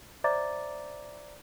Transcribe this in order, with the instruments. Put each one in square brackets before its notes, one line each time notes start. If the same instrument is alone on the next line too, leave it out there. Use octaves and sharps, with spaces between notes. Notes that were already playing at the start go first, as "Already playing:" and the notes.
[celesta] C5 D5 E5 A#5 D6 A6